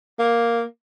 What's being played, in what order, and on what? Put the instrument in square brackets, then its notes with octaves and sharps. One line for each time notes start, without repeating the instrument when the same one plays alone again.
[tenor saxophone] A#3